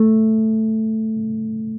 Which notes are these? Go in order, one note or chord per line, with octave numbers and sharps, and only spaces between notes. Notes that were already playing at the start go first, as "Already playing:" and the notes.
Already playing: A3